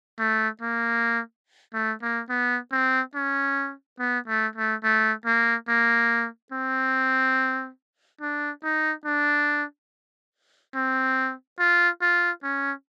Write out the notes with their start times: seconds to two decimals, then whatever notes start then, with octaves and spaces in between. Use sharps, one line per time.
0.19 A3
0.61 A#3
1.74 A3
2.02 A#3
2.29 B3
2.72 C4
3.15 C#4
3.99 B3
4.27 A3
4.55 A3
4.83 A3
5.26 A#3
5.68 A#3
6.52 C4
8.21 D4
8.64 D#4
9.05 D4
10.75 C4
11.59 F4
12.01 F4
12.43 C#4